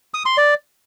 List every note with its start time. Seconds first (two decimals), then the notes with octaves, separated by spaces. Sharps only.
0.14 D#6
0.26 C6
0.37 D5